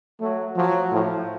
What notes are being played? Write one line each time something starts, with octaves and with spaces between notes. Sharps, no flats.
F#3 A3
F3 F#3
A2 F3